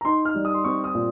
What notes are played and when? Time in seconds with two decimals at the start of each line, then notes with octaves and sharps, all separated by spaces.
0.01 A#5
0.05 D#4 C6
0.25 F6
0.35 G3
0.45 D#6
0.54 C6
0.64 C4 C#6
0.84 D#6
0.95 A#2